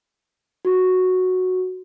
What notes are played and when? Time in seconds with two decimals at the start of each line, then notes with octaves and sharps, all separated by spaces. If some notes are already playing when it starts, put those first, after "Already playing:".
0.65 F#4